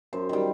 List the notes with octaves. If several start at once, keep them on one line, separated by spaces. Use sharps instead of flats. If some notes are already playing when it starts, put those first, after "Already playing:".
F#2 C5
D#3 G3